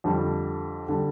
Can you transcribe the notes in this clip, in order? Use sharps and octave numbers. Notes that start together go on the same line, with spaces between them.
F2 D3 G3
D3 G3